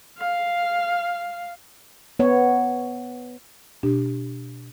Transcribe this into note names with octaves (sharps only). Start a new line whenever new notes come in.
F5
B3 C#5
B2 D4 G4